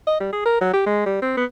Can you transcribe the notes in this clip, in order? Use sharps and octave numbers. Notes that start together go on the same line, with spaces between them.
D#5
G3
G#4
A#4
F#3
G4
G#3
G3
C4
B3